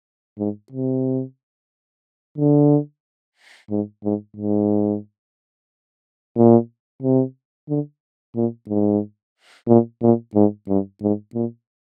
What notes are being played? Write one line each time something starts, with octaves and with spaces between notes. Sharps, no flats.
G#2
C3
D3
G#2
G#2
G#2
A#2
C3
D3
A#2
G#2
A#2
A#2
G#2
G2
G#2
A#2